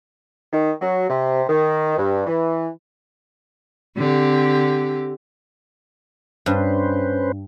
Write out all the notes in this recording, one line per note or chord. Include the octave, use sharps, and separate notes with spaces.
D#3
F#3
C3
D#3
G2
E3
D3 C4 G4
G2 C#4 B4 C5